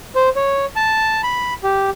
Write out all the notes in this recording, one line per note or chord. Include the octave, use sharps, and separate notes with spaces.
C5
C#5
A5
B5
G4